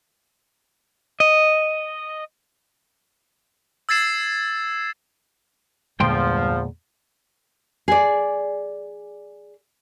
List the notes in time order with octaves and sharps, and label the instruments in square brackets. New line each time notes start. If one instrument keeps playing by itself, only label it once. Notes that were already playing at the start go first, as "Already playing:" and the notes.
[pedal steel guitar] D#5
[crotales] E6 G#6 A6 C7 E7
[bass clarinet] E2 [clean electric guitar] G2 G5 C6 [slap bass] A#2 D3 G#3 [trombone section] F3
[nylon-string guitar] G#4 D5